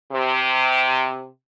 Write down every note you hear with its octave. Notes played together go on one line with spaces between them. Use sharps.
C3